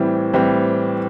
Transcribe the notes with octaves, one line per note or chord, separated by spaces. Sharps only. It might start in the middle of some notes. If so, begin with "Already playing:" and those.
Already playing: A2 E3 G3 C4
A2 E3 G3 C4